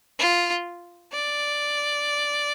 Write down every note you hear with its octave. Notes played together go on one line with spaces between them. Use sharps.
F4
D5